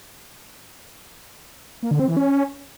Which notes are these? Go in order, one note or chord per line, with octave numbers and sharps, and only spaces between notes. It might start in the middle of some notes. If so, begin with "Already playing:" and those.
A#3
D3
C4
E3
C#4